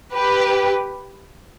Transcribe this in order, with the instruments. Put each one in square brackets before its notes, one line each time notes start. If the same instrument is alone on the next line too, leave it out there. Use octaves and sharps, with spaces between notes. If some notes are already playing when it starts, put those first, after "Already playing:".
[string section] G4 B4